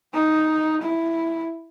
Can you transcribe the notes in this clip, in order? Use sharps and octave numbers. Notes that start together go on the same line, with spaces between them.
D#4
E4